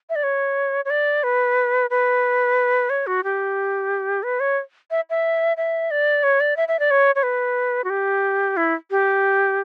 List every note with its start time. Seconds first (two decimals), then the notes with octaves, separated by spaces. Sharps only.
0.10 E5
0.16 D5
0.23 C#5
0.85 C#5
0.90 D5
1.24 B4
1.90 B4
2.90 C#5
3.07 F#4
3.24 G4
4.23 B4
4.40 C#5
4.91 E5
5.10 E5
5.57 E5
5.91 D5
6.23 C#5
6.40 D5
6.57 E5
6.68 E5
6.79 D5
6.91 C#5
7.15 C#5
7.23 B4
7.84 F#4
7.90 G4
8.57 E4
8.91 G4